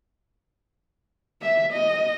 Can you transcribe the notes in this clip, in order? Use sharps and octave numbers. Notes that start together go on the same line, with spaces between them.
E5
D#5